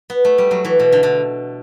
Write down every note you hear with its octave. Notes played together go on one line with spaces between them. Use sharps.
B3
A3
G3
F#3
E3
B2
D3
D3